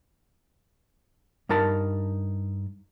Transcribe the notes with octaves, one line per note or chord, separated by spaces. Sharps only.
G2 D#4 A#4 A5 B5